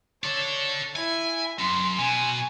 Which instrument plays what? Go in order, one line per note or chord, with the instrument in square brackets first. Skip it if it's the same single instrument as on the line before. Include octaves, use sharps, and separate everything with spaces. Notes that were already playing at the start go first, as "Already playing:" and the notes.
[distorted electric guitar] A4 D5 [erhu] C#5
[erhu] E4 [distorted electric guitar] G#5
[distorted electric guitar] F#2 [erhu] C6
[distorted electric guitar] B2 [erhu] G#5